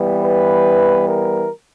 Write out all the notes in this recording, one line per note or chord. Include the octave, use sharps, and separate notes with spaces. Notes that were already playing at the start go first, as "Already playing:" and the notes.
Already playing: E3 G3 B3
B4
A#4